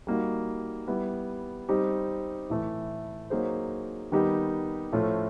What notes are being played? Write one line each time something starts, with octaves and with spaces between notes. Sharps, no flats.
G3 A#3 D#4 F#4
G3 B3 E4
G3 C4 D#4 G4
A2 E3 A3
F#3 A#3 D#4 G#4 C5
D#3 G3 B3 D#4 G4
A2 F3 A3 C#4 F4